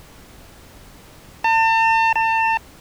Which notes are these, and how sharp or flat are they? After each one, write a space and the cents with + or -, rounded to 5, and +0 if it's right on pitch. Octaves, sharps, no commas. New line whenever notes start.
A5 +40
A5 +35